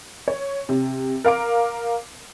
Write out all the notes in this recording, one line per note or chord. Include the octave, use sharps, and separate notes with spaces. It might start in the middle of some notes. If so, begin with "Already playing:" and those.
C#5
C3
A#4 F5 D6 D7